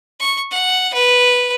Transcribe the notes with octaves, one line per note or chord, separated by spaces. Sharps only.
C#6
F#5
B4